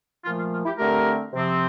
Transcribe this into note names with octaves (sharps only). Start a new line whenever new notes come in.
A#2 F3 A3 F4
F4
F4
E4 G4
D3 A3 C4 G4 A#4
C3 F3 C4